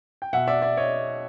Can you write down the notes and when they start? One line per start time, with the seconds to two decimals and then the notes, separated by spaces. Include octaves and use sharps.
0.22 G5
0.33 B2 E5 F#5
0.48 D5 E5
0.62 D5 E5
0.77 C#5 D#5